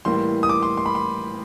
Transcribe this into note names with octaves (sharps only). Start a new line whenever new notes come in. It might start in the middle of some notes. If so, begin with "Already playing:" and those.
A2 E3 G3 A#3 C6
D#6
D6
C6
C6
B5
C6